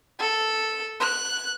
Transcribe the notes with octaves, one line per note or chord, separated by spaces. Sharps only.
A4
F#6